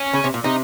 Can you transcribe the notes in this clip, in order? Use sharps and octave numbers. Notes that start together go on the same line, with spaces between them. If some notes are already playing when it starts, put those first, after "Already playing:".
Already playing: C#4
C#3
C3
A#2
C3 D#4